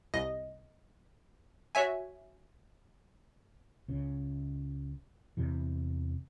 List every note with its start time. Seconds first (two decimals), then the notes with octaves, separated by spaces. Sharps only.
0.14 C2 D#5
1.75 F#4 C#5 E5 G#5
3.88 C#2 C#3
5.37 E2 C3 E3